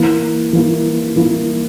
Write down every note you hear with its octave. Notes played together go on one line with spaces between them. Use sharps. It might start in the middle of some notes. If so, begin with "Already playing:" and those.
Already playing: E3 A#3 E4
E3 A#3 E4
E3 A#3 E4